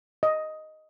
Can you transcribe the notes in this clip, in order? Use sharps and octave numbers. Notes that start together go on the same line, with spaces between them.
D#5